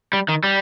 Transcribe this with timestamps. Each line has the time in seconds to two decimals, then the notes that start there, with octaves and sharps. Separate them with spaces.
0.13 G3
0.29 D#3
0.44 G3